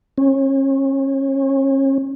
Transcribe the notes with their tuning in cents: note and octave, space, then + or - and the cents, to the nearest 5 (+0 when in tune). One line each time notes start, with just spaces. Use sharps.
C#4 -35